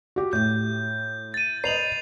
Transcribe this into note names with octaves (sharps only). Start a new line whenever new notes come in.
F#4 G4
A2 G6
A6 D#7
B4 D#5 C7 F7 F#7